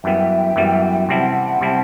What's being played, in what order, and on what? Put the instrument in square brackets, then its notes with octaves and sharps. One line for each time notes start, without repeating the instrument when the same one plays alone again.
[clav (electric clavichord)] F#2 E3 G3 B3 [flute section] E5 G5
[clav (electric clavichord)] F#2 E3 G3 B3
[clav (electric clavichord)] C3 G3 C4 E4 [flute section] F#5 A5
[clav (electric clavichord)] C3 G3 C4 E4